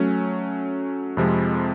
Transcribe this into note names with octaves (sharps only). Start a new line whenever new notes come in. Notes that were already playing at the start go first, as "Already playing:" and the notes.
Already playing: F#3 A3 C#4
F2 C3 F3 G#3